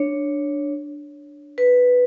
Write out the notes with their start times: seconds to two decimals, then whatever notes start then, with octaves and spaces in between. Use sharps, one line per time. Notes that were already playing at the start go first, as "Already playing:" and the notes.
Already playing: D4 C#5
1.58 B4